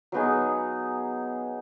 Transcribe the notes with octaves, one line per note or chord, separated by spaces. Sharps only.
F#3 B3 D#4 G#4